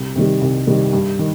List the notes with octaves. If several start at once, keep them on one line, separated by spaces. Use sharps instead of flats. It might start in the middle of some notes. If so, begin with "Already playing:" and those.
Already playing: C2
C3 D#3 G3
C2
C3 D#3 G3
G2
D#3